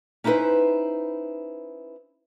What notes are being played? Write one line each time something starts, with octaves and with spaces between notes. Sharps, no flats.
C#4 D#4 E4 F#4 B4 C5